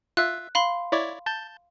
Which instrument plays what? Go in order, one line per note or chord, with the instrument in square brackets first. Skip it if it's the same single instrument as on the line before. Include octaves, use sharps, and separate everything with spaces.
[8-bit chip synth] F4 E5 [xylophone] F#6
[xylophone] F5 B5 C6
[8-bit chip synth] E4 C#5 D5
A5 G6